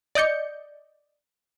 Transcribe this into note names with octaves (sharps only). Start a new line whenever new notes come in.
D5 D#5 G6 C#7